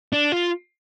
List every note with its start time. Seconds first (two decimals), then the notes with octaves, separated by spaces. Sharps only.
0.13 D4
0.32 F4